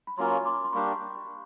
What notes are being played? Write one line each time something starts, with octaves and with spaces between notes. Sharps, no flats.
B5
F#3 A#3 C#4 F4 A#5 C6
C6 D6
C6
G3 A#3 D4 G4 B5 C#6